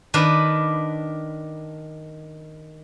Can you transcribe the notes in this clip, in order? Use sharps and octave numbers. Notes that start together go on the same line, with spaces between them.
D#3 D4 B4